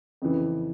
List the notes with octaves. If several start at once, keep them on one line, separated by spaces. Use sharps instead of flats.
F2 C#3 E3